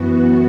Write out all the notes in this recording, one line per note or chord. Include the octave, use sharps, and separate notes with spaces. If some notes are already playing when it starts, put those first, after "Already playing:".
Already playing: F#2 E3 B3 F#4